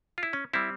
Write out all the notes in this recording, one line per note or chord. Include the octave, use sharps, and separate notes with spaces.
F4
E4
C#4
G3 C4 E4